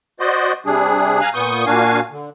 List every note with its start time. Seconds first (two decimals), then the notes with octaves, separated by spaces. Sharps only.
0.20 F#4 C5 D5 D#5
0.66 C3 G3 D4 G#4
1.21 F5 G#5 A#5 F#6
1.34 A#2 B3 C#6 D#6 G6
1.66 A#2 A#3 D4 F#4 F5 G#5
2.11 D3